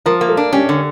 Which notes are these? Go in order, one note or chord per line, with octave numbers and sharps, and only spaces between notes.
F3 A#4
A#3
A4
D4
C#4 G4
D3